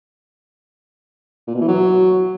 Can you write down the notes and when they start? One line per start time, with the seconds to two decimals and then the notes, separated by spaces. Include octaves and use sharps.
1.48 A#2
1.54 B2
1.61 E3
1.68 F#3